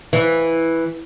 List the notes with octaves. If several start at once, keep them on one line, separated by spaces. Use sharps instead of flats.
E3